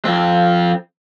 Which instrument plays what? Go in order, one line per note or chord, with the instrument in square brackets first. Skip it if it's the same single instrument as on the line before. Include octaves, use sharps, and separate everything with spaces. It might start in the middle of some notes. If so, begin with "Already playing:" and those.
[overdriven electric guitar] F2 C4